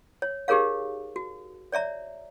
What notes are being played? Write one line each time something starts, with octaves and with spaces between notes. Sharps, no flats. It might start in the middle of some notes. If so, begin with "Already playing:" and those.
C#5
D#4 G4 G#4 A#4 C#5 F5
F#4
C#5 D5 E5 A#5